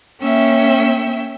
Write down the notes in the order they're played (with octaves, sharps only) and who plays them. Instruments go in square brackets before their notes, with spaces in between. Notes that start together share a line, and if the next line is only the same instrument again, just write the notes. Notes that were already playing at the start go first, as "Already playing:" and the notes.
[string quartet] A#3 C#4 E5 G5 E6